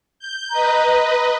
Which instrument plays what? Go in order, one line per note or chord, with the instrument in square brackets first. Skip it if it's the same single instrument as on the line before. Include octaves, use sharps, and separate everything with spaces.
[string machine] G6
[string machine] B4 D#5 [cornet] A#5